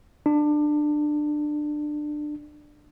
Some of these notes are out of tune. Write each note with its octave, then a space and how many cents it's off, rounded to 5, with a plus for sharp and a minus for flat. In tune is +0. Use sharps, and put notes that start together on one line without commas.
D4 +20